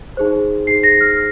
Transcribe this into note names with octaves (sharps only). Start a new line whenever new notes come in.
D#4 G#4 C5
D#4 G#4 C5 C7
A#6
F6